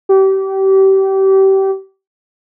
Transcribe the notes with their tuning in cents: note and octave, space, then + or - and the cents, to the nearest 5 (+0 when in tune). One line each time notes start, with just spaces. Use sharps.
G4 -30